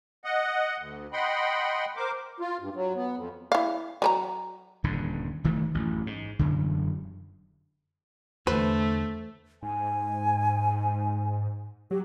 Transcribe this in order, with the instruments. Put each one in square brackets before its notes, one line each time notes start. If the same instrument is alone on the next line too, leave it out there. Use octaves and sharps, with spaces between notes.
[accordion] D#5 F#5
D2
D#5 F#5 G5 B5 C6
A#4 C5 D6
F4
G2
F#3
B3
F2
[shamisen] E4 F5
F#3 B4 A#5
[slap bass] D#1 G2 D3
F1 D#3 E3 A3
A1 F#2
G#2
E1 F#2 D3
[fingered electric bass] E2 D3 [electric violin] A3 [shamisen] B4 [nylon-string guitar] C5
[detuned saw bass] G#2 [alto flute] G#5
[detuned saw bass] F#3 [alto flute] G4